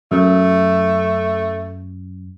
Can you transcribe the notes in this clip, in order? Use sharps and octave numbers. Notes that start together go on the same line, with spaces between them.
F#2 A3